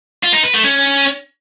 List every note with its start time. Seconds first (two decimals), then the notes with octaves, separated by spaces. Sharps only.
0.24 F4
0.34 D#4
0.44 B4
0.54 A3
0.64 C#4